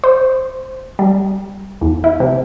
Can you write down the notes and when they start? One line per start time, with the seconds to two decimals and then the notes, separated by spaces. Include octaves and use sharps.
0.04 C5
0.99 G3
1.81 E2
2.04 E4
2.20 C3